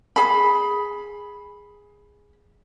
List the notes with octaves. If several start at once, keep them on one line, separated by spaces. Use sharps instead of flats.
G#4 B5